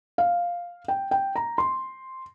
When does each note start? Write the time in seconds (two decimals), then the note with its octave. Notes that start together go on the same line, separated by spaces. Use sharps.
0.18 F5
0.88 G5
1.11 G5
1.36 A#5
1.58 C6